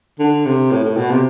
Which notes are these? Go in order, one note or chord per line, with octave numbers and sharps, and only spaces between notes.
D3
C3
A2
A2
B2
C3